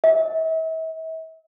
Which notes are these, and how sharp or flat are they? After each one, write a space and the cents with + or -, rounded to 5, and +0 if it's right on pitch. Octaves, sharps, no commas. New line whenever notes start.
E5 -40